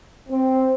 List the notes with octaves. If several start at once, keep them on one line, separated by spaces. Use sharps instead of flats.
C4